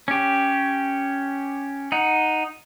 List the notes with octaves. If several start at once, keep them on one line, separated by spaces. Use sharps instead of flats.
C#4 G4
D#4 F#5